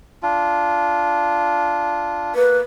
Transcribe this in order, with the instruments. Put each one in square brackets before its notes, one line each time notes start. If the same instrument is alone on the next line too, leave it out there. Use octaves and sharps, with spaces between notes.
[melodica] D4 F4
[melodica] A#3 [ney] B4